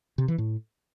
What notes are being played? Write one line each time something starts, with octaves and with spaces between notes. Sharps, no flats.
C3
E3
A2